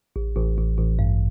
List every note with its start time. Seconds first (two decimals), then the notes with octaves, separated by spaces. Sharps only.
0.16 A1
0.37 A1
0.58 A1
0.78 A1
0.99 G2